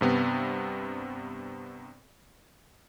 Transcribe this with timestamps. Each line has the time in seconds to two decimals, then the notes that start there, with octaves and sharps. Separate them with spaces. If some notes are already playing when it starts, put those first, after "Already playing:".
0.01 G2 C3 B3